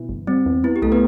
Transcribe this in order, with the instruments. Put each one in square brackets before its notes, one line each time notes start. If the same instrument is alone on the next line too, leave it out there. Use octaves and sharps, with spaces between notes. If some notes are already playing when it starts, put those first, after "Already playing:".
Already playing: [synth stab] B2 E3
G1
[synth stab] G3 [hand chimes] C4
[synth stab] E2
[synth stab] B3 [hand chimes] E4
[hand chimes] G4
[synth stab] C2 [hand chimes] A3 A4
[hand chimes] B3 B4